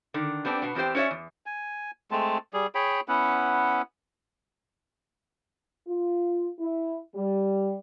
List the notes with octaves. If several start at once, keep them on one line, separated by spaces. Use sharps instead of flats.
D3 D#3
G3 B3 C4 D4
B2 B3
E2 C4 G4 C5
C#4 F#4 C#5 D5 E5
E2
G#5
G#3 A3 C4 A5
G3 G#4
G#4 C#5 G5 B5
B3 C#4 E4 F#5
F4
E4
G3